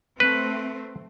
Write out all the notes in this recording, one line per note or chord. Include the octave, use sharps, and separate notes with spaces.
A3 C4 B4